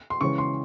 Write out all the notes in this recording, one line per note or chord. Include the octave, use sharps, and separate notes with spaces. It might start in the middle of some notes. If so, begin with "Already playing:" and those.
C6
C#3 E3 G#3 C#4 C#6
C6